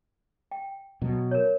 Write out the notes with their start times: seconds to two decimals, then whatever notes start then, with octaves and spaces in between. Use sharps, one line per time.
0.51 G5
1.02 B2 F#3
1.31 A#4 C#5